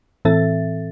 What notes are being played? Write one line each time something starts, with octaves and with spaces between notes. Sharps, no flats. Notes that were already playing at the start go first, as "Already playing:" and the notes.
A2 E3 C4 A4 E5 A6